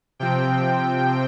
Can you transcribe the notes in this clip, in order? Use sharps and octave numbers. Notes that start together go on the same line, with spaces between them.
C3 F3 C4 G5